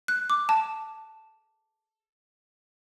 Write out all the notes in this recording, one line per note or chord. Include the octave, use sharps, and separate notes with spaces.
F#6
D6
A5